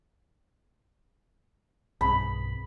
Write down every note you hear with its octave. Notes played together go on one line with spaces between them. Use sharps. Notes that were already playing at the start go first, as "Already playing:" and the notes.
B1 G2 C4 B5